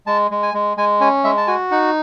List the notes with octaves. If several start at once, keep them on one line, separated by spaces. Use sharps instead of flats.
G#3 A5
G#3
G#5
G#3
G#3 G#5
C#4 G#5
G#3 E5
A5
F#4 G#5
D#4 F#5